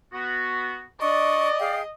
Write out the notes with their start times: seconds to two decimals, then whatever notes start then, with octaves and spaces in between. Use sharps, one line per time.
0.13 B3 F#4
1.01 D4 D5 D#5 C#6
1.60 G#4 F5 G5